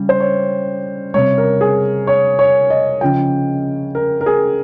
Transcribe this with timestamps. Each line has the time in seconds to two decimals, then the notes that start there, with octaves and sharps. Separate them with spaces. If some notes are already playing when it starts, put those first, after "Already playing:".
Already playing: C#3 G3
0.09 C5
0.20 C#5
1.14 C3 G3 C#5
1.38 A#4
1.61 G#4
2.07 C#5
2.39 C#5
2.70 D#5
3.01 C#3 F3 G5
3.95 A#4
4.21 A#4
4.26 G#4